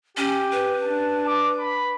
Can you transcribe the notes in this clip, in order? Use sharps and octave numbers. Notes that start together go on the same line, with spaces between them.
C#4 G4
B4
D4 A5
D6
B5